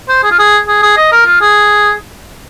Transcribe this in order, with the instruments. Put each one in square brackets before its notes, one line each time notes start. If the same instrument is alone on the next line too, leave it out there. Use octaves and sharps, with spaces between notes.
[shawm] C5
G#4
F4
G#4
G#4
G#4
D#5
A#4
F4
G#4